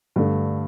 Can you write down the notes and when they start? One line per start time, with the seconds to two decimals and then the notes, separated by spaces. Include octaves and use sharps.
0.16 G2 D3 A3 D4